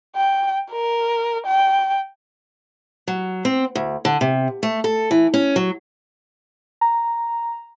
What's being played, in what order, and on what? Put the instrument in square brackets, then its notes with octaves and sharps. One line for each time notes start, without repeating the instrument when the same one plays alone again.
[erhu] G5
A#4
G5
[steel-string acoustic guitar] F#3
C4
D2
D3
C3
A3
A4
E3
C#4
F#3
[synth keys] A#5